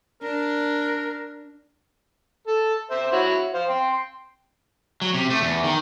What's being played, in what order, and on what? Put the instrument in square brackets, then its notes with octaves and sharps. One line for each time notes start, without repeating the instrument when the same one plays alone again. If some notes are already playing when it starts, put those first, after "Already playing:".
[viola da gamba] D4 [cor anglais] A#4
[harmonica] A4
C5 E5
E4 F#4 C#5
C5 F5
G5 C6
[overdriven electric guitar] F#3
C3
A3
E2
D#3